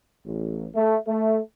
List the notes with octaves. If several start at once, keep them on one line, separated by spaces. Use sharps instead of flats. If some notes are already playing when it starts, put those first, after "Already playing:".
A1
A3
A3